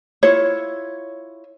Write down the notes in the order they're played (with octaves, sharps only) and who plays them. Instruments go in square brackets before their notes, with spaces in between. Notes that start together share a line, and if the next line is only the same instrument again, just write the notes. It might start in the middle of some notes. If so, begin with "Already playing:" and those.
[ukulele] E4 F4 C#5